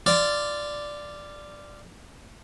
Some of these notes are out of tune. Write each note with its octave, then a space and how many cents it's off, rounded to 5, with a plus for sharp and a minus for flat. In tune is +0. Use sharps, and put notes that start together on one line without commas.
F4 -15 D5 +0